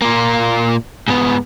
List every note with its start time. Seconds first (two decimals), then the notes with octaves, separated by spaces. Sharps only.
0.02 A#2 A#3
1.08 G#2 B3